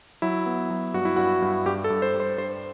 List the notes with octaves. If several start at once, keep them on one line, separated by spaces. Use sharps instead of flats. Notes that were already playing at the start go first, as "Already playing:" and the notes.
F#3 E4
B3
F#3
G2 F#4
E4
G2 F#4
G2
G2 G4
A4
G2
C5
G3
C5
G2 C5